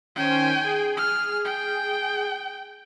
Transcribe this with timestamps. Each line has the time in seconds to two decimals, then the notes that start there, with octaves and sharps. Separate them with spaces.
0.15 D#3 C#4 C5 G5 G#5
0.63 G#4
0.97 F6
1.45 G5